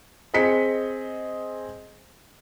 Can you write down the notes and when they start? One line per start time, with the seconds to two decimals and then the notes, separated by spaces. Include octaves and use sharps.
0.34 C4 G#4 D#5 B6 C#7